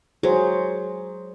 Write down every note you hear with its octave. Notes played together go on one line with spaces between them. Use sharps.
F#3 G#4 C5